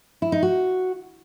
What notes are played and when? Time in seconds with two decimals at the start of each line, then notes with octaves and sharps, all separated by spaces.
0.22 E4
0.32 D#4
0.42 F#4